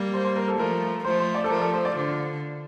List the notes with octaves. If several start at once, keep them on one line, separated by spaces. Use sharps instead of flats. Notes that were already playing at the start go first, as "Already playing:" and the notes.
Already playing: G3 A#3
C5
C5
A#4
A4
F3 A3 A#4
F3 A3 C5
C5
D5
A4
F3 A3 A#4
A4
C5
D5
D3 F4